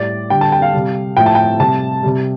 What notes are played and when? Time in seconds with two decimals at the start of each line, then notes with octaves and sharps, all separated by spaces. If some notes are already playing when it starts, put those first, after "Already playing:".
Already playing: A2 G3 D5
0.30 D3 G3 G5
0.41 A5
0.52 G5
0.62 F5
0.74 C3 G3
1.17 A2 F3 A3 G5
1.26 A5
1.35 G5
1.60 C3 G3 A5
2.03 C3 G3